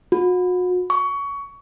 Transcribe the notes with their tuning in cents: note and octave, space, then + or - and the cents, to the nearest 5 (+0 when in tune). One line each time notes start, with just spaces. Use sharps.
F#4 -35
C#6 +20